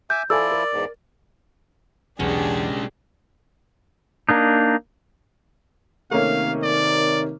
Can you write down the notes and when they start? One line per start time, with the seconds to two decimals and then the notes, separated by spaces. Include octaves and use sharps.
0.10 E5 G#5 D6 G6
0.30 F3 E4 F4 A4 D5 G#5 E6
0.51 A#4
0.72 E2 G#2
2.20 B1 E2 G#3 C#4 D4 G4 G#4
4.29 A#3 D4 D#4
6.11 C3 D#3 A3 A#3 C#4 F5
6.63 D5